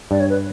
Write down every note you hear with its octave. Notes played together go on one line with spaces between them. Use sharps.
G2 D5
C#5
B4